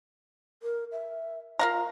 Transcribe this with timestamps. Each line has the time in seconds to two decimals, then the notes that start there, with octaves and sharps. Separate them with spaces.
0.63 A#4
0.92 E5
1.59 F4 A#4 F5 A#5